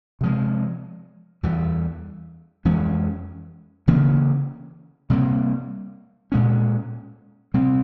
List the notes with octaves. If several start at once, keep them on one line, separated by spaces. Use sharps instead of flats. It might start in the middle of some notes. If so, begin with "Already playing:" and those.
C3 F3 G#3
E2 E3 G3
F2 E3 G#3 C#4
C#3 E3 A#3 C#4
C3 G3 A#3
A#2 G#3 C#4
C3 G3 C4